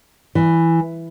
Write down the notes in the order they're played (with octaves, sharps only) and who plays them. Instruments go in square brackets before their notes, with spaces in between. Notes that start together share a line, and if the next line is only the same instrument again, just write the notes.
[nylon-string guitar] E3